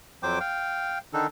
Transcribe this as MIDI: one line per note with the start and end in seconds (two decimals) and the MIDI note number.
0.23 0.39 41
0.23 0.39 54
0.23 0.39 72
0.23 0.39 79
0.23 0.39 86
0.40 0.98 77
0.40 0.98 79
1.13 1.27 50
1.13 1.27 51
1.13 1.27 62
1.13 1.27 63
1.13 1.27 69